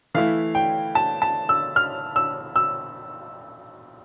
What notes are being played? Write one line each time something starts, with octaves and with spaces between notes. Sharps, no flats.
E3 A3 E4 F5
G5
A5
A5
E6
F6
E6
E6